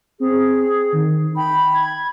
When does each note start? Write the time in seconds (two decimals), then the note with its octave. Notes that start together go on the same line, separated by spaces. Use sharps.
0.20 C4 G#4
0.93 D#3
1.36 G5 B5
1.74 G#6